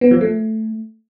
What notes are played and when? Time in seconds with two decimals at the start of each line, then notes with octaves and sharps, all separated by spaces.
0.01 B3
0.11 F3
0.21 A3